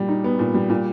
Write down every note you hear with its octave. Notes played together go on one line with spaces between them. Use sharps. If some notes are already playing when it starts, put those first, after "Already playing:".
Already playing: A#2 G3
D#4
B3
A#2
G3
A#2